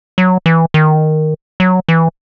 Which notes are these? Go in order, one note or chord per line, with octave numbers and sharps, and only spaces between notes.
F#3
E3
D#3
F#3
E3